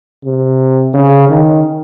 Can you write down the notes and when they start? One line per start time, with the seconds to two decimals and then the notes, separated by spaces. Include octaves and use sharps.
0.25 C3
0.94 C#3
1.29 D#3